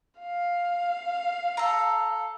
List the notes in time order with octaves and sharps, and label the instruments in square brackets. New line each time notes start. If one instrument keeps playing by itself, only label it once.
[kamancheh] F5
[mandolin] A4 A#5